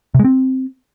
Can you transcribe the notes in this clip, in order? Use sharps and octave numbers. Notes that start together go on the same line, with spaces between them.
C3
G#3
C4